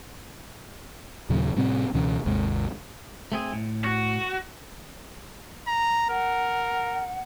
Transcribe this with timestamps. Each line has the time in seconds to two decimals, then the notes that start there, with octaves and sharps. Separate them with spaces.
1.29 D#2 A#2 C#3 F#3
1.56 A2 C3 G3 C4
1.94 C#2 B2 E3 C#4
2.25 G#1 D#2 C3 G#3
3.32 A3 C4 G#4
3.53 A2
3.84 F#4
5.68 A#5
6.10 A#4 F#5